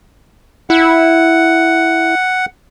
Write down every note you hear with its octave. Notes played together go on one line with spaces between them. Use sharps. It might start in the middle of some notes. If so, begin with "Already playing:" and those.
E4 F#5